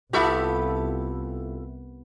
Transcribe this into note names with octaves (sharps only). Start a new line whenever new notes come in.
C2 B3 E4 F4 G4 A4 E5